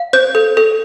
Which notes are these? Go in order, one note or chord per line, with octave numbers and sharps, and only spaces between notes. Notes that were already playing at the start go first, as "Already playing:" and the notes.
Already playing: F5
C5 G6
A4
A4